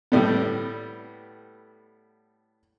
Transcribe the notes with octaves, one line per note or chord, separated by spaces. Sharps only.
A2 G3 A3 B3